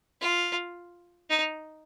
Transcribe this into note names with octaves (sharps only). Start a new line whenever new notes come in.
F4
D#4